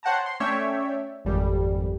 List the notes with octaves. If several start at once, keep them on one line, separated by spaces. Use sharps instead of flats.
C5 C#5 F#5 G5 A5 A#5
C6
A3 C#4 C#5 D5 E5 G5
G#1 F2 G3